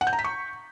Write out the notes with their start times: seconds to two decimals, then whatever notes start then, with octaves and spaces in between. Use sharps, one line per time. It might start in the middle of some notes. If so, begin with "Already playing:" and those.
0.01 F#5
0.07 G6
0.13 A#5
0.19 B6
0.24 C#6